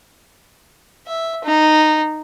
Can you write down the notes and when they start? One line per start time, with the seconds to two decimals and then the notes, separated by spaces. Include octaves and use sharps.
1.07 E5
1.44 D#4